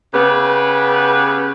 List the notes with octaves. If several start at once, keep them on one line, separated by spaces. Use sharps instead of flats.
C#3 B3 G4 B4